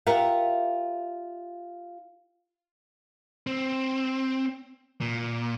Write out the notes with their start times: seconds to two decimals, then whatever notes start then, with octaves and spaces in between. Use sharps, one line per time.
0.07 F4 G4 A#4 E5 F#5
3.47 C4
5.01 A#2